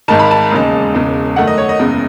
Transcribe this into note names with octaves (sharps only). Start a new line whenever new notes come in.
G#1 G#2 D#3 A5
B5
A5
E1 D#2 C#3 G#3
E1 E2 C#3 G#3
F#2 D#3 A3 F#5
D#5
C#5
D#5
F#1 E2 C#3 G#3